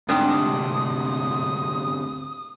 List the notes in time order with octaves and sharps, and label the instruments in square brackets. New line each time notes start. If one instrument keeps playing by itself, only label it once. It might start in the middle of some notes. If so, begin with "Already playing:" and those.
[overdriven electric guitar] D2 C3 [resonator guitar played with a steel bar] G#2 D4 G5 [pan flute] D#6